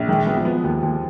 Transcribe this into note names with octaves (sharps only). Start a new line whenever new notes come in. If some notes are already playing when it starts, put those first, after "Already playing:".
Already playing: A#1
D#3 G#3
B3
F3
B3
D#2
D#2